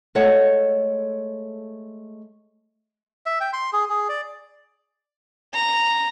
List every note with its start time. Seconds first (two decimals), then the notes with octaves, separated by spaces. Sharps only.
0.15 G#3 A3 A4 C#5 F#5
3.26 E5
3.40 G5
3.53 C6
3.73 G#4
3.89 G#4
4.09 D5
5.54 A#5